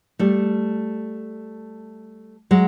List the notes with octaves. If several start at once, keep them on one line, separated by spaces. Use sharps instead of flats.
G3 A3
F#3 G#3